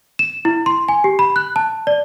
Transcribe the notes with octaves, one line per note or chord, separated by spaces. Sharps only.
E7
E4
C6
G#5
G4
B5
F#6
A5
D5